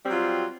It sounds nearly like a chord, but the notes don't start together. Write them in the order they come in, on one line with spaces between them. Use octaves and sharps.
G3 C4 F#3 F4